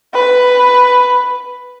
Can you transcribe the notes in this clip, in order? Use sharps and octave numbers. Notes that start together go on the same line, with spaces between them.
B4